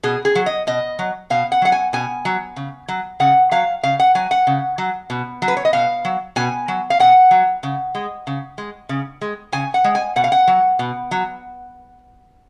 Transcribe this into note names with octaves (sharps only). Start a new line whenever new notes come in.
B2 G#4
G#4
F#3
D#5
B2 D#5
F#3
B2 F5
F#5
F#3 F#5
G#5
B2 G#5
F#3
C#3
F#3
C#3 F#5
F#3 F5
C#3 F5
F#5
F#3 G#5
F#5
C#3
F#3
B2
F#3
B4
C#5
D#5
B2 F5
F#3
B2 G#5
F#3
F5
B2 F#5
F#3
C#3
G#3
C#3
G#3
C#3
G#3
C#3 G#5
F#5
G#3
G#5
B2 F#5
F5
F#5
F#3
B2
F#3